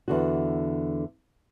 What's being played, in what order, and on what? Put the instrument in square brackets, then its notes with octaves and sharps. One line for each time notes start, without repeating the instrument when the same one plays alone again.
[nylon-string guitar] E2 D3 F#4